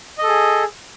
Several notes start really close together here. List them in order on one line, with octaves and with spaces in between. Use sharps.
D#5 A4 G#4